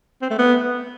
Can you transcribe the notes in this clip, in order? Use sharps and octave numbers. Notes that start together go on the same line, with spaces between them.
C4
A3
B3